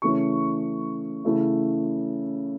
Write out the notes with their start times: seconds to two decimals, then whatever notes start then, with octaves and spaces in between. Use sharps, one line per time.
0.02 C#3 E3 A3 C#4 C#6
1.24 C#3 E3 A3 E4